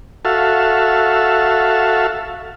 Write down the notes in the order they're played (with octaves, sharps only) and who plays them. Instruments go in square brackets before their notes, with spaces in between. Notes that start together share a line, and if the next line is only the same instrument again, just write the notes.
[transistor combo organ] F#4 A4 E5 F5